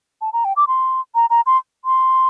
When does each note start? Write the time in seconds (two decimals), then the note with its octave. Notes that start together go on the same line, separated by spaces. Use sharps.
0.21 A5
0.33 A#5
0.45 G5
0.57 D6
0.68 C6
1.15 A#5
1.30 A#5
1.46 C6
1.85 C6